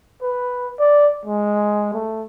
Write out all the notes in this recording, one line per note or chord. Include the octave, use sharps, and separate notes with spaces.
B4
D5
G#3
A3